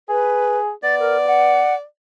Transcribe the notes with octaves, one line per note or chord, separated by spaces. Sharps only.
G#4 B4
B3 D5 A6
A#4
F#5